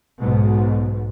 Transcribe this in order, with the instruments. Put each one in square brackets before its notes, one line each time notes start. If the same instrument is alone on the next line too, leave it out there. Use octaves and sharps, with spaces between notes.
[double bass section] B1 G#2 B2